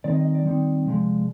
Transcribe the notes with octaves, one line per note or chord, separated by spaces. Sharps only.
D#3 G3 C4 D#4 D5
D#5
D#5
D5
D#3 G3 C4 D#4
C3 F3 G#3